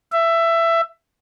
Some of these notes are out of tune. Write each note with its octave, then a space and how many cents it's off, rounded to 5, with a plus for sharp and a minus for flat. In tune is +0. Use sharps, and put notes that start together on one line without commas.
E5 +15